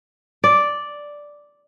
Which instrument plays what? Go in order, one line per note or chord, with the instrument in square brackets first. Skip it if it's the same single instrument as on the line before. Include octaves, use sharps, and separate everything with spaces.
[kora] D5